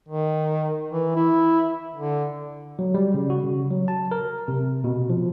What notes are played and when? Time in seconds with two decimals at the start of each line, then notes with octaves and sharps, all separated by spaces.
0.08 D#3
0.90 E3
1.16 E4
1.96 D3
2.79 F#3
2.94 G3
3.14 C#3
3.30 F#4
3.44 C#3
3.71 F#3
3.88 A5
4.11 A#4
4.48 C3
4.84 B2
5.10 F3